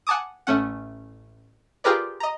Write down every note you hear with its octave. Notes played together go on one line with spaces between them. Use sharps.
F#5 G#5 A5 D6 D#6
A1 A3 C#4 F#5
F4 G4 G#4 A#4 B4 D5
D#5 A#5